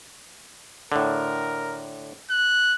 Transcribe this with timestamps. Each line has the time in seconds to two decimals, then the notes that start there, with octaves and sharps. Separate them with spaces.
0.92 A2 D3 A#4
2.30 F#6